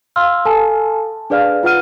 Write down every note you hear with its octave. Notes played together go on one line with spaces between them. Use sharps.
F5 C6 E6 F6
A4 G#5 A5
D4 G#4 B4 D5 F5 F6
F4 B4 F#5 F6 D#7